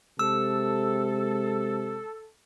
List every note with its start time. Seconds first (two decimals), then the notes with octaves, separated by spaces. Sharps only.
0.19 C3 G#3 A4 E6